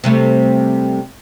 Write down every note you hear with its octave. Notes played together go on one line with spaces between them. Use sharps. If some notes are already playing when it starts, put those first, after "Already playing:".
C3 G3 A3